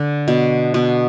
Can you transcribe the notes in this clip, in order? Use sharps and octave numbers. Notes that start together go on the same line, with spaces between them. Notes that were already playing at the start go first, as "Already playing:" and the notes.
Already playing: D3
B2
B2